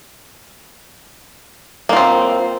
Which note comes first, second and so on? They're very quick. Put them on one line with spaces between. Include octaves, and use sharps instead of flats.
A#3 F4 C4